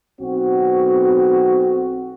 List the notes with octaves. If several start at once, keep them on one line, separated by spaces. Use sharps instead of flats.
B1 C4 F#4